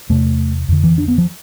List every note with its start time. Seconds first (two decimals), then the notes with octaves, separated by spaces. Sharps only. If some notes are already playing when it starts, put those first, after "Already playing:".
0.09 E2 C3 A3
0.69 F2 D3
0.84 E3
0.98 D4
1.08 B3
1.18 F3